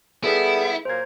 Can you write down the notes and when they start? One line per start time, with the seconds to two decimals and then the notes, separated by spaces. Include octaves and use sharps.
0.24 G3 B3 E4 G#4 A4
0.85 A#2 F#3 A#3 C5 G#6